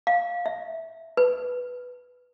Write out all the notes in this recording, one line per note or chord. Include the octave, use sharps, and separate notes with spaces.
F5
E5
B4